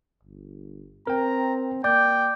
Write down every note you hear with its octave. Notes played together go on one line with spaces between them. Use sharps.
G1
C4 A#4 G5 A#5
A#3 D5 G5 D6 G6